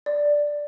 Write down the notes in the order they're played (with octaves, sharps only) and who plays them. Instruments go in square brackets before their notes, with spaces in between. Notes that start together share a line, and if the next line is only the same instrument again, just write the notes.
[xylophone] D5